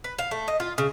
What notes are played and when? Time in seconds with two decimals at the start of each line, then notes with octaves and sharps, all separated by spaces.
0.04 B4
0.18 F5
0.31 A3
0.48 D#5
0.60 F4
0.78 C#3